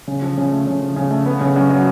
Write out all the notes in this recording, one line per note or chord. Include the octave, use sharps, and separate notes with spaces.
C#3
F3
C#3
A3
C#3
F3
C#3
A3
B3
C#3
F#2
F#3